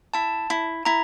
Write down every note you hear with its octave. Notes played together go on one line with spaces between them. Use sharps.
E4 A5
E4
E4 A#5